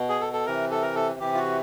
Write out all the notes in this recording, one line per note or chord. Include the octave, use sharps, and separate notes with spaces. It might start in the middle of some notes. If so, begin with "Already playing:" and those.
Already playing: B2
G#4
A4
A4
C3 E3 A#4
A4
A#4
A4
C3 E3 G4
F4
F#4